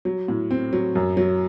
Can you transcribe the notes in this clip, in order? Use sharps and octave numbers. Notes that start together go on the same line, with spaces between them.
F#3
A2
C4
F#3
F#2
F#3